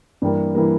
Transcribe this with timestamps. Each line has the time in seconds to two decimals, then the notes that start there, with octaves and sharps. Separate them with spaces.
0.22 G2 E3 G3 A#3
0.55 E3 G3 A#3